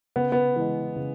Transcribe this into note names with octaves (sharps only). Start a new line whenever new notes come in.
C#3 B3
B3
E3 G#3
C#3